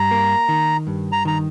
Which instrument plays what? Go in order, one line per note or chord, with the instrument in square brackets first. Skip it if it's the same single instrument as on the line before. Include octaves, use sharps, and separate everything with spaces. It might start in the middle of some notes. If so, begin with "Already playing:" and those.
Already playing: [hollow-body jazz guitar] G2 [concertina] A#5
[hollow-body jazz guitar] A#3
D#3
G2
[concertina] A#5
[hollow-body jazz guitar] D#3 [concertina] A#5